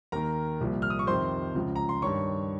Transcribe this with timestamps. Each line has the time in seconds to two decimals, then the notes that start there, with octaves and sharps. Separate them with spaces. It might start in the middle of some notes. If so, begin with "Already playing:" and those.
0.12 D#2 D#3 A#4 A#5
0.61 C2 A#2 F3
0.82 F6
0.90 D#6
0.99 C#6
1.07 F2 C3 D#3 C5 C6
1.55 C#2 C#3 F3
1.76 A#5
1.89 C6
2.02 G2 D#3 C#5 C#6